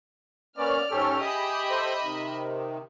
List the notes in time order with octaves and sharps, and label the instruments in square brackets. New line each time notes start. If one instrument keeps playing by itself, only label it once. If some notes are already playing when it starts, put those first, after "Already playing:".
[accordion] A#3 B3 C#4 [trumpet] D5 [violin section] F6
[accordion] G#2 C#4 A4 [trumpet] G4
[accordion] G#4 [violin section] D#5 E5 B5
[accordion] A4 C5
C3 D#3